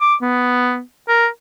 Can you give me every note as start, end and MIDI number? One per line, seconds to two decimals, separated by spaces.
0.01 0.15 86
0.22 0.81 59
1.08 1.27 70